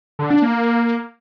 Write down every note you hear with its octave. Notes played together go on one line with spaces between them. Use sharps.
D3
D4
A#3